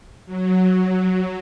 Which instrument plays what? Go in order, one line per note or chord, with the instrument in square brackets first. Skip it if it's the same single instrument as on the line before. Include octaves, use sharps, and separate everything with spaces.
[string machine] F#3